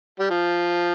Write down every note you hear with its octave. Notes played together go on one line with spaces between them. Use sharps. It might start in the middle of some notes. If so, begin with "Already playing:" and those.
G3
F3